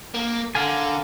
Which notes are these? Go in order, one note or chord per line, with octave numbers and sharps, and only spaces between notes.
A#3
D3 A#4 F5 G#5